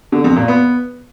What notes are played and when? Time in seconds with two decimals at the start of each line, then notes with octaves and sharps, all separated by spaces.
0.12 D3
0.24 F2
0.36 A#2
0.48 B3